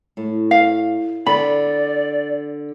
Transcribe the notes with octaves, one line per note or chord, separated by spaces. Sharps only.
A2
F5
D3 D5 B5